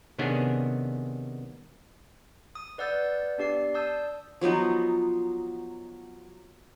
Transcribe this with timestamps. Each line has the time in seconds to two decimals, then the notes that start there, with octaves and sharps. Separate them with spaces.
0.19 C3 D#3 B3 C#4 D4 G#4
2.55 D#6
2.78 B4 D5 F#5 E6 G6 A6
3.38 B3 D4 G4 D5 C7
3.74 D5 A5 D#6 E6 G6
4.41 F3 F#3 B3 D#4